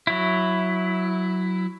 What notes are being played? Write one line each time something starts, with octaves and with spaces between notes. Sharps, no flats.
F#3 E4